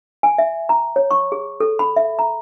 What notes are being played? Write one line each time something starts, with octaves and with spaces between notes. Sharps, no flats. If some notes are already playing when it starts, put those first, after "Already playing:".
G#5
E5
A#5
C#5
C#6
G#4
A4
B5
E5
A#5